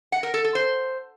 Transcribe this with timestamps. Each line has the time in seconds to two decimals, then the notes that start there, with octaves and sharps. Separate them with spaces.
0.12 F#5
0.23 A#4
0.34 A4
0.44 A4
0.55 C5